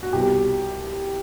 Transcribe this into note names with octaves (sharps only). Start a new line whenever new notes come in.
F#4
C2 B2 G3 G4